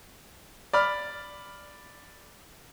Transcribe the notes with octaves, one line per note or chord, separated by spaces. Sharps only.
D5 B5 F6